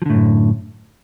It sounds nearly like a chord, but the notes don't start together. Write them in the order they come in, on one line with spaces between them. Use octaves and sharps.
F3 D3 A2 F#2